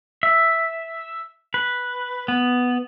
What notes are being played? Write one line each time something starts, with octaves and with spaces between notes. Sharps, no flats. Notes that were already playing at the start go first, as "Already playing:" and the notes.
E5
B4
B3